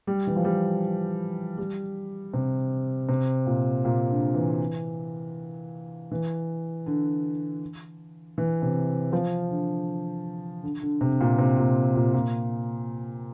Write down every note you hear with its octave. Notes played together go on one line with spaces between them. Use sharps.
G3
E3
F3
G3
G3
C3
C3
A#2
A#2
D3
E3
E3
D3
E3
C3
F3
D3
D3
D3
C3
A#2
C3
A#2
A#2
A#2